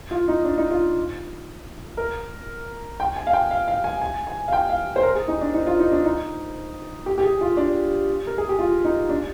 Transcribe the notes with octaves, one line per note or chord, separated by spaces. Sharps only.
F4
D#4
D4
D#4
F4
A#4
G5
G#5
F5
G5
F5
F5
G#5
G#5
G#5
F5
G5
F5
C5
A#4
G#4
D#4
D4
D#4
F4
D#4
D4
D#4
G4
G4
G#4
F4
D4
A#4
G#4
G4
F4
D#4
D4